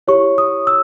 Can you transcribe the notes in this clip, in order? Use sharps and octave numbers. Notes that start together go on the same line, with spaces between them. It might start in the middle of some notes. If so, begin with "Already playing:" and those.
E4 G4 C#5 C#6
D#6
E6